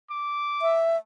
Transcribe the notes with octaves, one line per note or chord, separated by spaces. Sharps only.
D6
E5